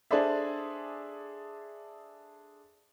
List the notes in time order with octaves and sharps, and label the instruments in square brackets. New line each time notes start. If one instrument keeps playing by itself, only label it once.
[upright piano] D4 G#4 A4 C5 D5 E5